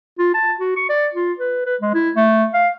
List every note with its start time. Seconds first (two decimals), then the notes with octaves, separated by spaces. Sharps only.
0.19 F4
0.34 A5
0.59 F#4
0.76 C#6
0.89 D5
1.14 F4
1.39 B4
1.66 B4
1.81 G#3
1.94 E4
2.16 A3
2.54 F5